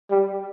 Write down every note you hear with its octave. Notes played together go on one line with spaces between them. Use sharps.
G3